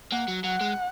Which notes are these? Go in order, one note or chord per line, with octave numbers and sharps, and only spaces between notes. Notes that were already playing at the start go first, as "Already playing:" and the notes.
A#3 F#5
F#3
F#3 F#5
G#3